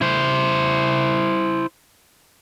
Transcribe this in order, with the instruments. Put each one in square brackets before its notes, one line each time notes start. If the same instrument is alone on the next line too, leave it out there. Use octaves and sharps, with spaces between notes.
[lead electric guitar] E4 C5